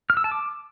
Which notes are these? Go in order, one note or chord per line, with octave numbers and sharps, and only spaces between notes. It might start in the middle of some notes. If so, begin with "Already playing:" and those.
F6
E6
A5
D6